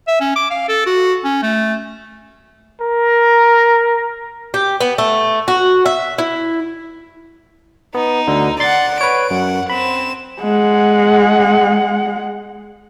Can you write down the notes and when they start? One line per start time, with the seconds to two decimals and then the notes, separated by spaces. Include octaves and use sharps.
0.08 E5
0.21 C#4
0.36 D6
0.51 F5
0.69 A4
0.87 F#4
1.24 C#4
1.43 A3
2.81 A#4
4.54 G4
4.80 B3
4.98 A3
5.48 F#4
5.86 E5
6.18 E4
7.95 B3 D#4
8.27 D2 D3
8.60 D5 F#5 C6 A6
9.01 B4 C#5 D7
9.31 F#2 F#5
9.70 C4 B5 E7
10.41 G#3 F#5